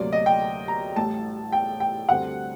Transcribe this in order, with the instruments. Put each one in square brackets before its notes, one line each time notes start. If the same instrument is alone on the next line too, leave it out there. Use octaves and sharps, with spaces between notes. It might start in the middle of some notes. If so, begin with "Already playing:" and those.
Already playing: [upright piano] D2 C3 F#3 A#3 D5
D#5
G5
A#5
A1 A2 G3 A5
G5
G5
D2 D3 G3 C4 F#5